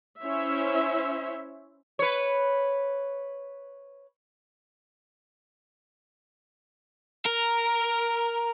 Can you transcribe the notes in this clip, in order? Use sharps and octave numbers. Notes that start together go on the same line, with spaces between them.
C#4 E4 C5 C#5 E5
B4 C#5
A#4